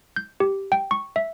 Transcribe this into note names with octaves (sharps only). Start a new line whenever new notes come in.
G6
G4
G5
C#6
E5